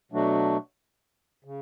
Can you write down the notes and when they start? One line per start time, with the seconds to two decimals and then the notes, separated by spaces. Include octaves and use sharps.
0.12 B2 F#3 A3 D4 F#4
1.44 C#3